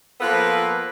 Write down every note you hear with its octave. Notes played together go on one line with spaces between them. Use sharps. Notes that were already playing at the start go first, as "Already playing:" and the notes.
F3 A#3 B3 F4 A4 B4